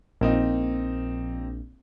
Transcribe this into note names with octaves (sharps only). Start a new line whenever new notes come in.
A#1 A#3 C4 D#4